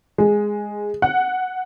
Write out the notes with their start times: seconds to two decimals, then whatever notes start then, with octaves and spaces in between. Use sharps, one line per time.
0.18 G#3
1.02 F#5